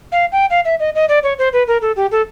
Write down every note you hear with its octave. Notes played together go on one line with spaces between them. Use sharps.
F5
G5
F5
E5
D#5
D#5
D5
C#5
C5
B4
A#4
A4
G4
A4